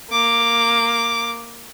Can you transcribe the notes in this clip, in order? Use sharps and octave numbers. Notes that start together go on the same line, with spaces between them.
A#3 D6